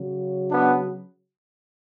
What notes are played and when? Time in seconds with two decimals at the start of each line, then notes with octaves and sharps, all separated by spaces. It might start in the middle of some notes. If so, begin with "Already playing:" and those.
Already playing: C#3 F#3
0.51 B3 D4